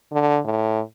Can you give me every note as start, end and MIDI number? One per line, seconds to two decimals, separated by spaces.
0.12 0.40 50
0.45 0.81 45